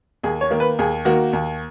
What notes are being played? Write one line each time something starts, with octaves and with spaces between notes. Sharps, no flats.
D#2 G#4
C#5
D#3 A#3
B4
D#2 G#4
D#3 A#3 F#4
D#2